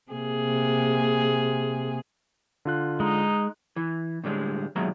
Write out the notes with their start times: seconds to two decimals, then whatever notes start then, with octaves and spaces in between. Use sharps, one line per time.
0.12 C3 A#3 G#4
2.65 D3 F4 F#6
3.00 G#3 D#4
3.76 E3
4.24 A2 D3 G3 G#3
4.76 D#2 B2 F#3 G#3 E5 A#5